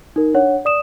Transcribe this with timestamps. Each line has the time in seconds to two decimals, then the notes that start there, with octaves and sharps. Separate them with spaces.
0.16 D#4 A#4
0.34 D4 C#5 F#5
0.65 D5 D#6 E7